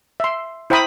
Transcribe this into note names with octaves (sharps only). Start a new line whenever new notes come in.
E5 C6
E4 C5 G5 A#5 B5 D#6